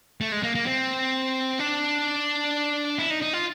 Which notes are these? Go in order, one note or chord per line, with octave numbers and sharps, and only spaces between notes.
A3
G#3
A#3
A#3
C4
D4
E4
D#4
D#4
F4